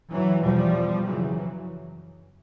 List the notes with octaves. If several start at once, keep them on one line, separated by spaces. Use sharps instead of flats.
E3 F#3
E2 B2 F3 G3
F#2 C#3 E3 F#3